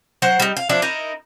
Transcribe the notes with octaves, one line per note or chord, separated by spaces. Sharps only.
F#3 C5 F#5
G3 D#4
F5
F3 D4 E4
D#4 E4 A#4